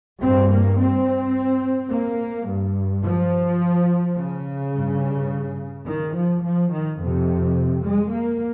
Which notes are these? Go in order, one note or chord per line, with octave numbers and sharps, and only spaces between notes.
G2 C4
A#3
C4
A#3
G2
F3
C#3
G2
D#3
F3
F3
D#3
F2
C3
G#3
A#3